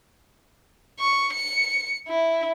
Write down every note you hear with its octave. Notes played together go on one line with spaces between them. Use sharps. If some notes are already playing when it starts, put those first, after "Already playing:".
C#6
C#7
E4